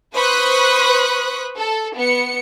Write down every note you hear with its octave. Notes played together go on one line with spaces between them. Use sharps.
B4 C5 B5 C#6 D#6 F#6
A4
B3 C#7